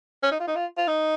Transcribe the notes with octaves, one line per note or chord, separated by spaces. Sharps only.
C#4
D#4
F4
D#4
F4
F4
D#4